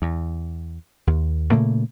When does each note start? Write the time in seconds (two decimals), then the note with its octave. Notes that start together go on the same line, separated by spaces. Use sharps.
0.02 E2
1.07 D#2
1.51 A#2 C#3 A3 A#3